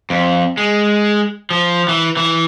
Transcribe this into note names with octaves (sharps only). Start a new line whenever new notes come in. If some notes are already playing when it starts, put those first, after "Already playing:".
F2
G#3
F3
E3
E3